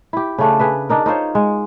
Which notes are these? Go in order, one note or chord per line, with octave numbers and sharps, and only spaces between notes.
E4 G4
C#3 A3 D4
G#4 B4 E5
D4 D#4 A#4
D#4 F4 C5 C#5
G#3